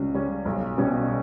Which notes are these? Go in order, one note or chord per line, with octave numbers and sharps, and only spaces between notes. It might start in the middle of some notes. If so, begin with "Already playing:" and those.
Already playing: C#2 C#3 G3 C#4
C#3 G3 C#4
B1
B2 G3 C#4 G4